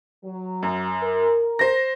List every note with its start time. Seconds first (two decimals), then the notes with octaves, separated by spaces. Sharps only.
0.23 F#3
0.63 F#2
1.03 A#4
1.59 C5 A#6